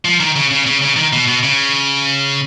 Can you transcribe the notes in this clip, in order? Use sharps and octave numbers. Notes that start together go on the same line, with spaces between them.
F3
D#3
C#3
C#3
C#3
C#3
D#3
B2
B2
C#3